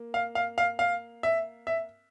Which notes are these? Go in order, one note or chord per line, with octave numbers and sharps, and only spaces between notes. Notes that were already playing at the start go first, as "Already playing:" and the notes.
Already playing: A#3
F5
F5
F5
F5
E5
E5